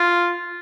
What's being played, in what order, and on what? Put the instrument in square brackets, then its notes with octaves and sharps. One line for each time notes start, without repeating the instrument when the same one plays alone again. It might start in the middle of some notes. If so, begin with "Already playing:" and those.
Already playing: [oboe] F4